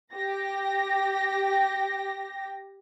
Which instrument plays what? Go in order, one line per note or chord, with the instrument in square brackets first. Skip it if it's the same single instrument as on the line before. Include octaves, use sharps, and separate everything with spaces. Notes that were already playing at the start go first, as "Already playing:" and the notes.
[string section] G4 A#6